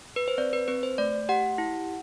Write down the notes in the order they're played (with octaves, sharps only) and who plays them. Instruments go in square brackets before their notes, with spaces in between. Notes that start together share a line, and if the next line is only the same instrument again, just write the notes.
[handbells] B4
C5
C4 D5
B4
C4 B4
C5
A3 D5
G4 F#5
E4